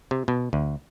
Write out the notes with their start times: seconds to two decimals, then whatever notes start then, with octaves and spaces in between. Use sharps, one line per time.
0.11 C3
0.28 B2
0.53 D2